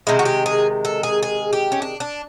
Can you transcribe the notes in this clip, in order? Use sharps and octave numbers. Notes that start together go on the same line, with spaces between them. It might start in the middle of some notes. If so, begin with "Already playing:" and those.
C3 D#3 G#3 E4
F#4
G4
G#4
A4
G#4
G#4
G4
C#4
D4
D4